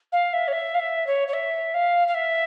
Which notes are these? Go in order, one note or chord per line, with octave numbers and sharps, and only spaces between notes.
F5
E5
C#5
E5
F5
E5
C#5
C#5
E5
F5
F5
E5